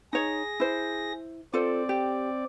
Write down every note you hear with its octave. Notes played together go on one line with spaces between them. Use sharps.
D#4 G#4 C#5 A#6
E4 C5
C4 F4 A4 C5 D5
G4